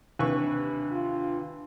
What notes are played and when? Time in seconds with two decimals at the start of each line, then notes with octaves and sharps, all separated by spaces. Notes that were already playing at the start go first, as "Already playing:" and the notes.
0.19 D#2 C3 E3 D4 B4 C#6
0.92 F4